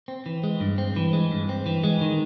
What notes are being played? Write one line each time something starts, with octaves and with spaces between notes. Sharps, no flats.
C4
E3
G#3
G2
C4
E3
G#3
G2
C4
E3
G#3
D#3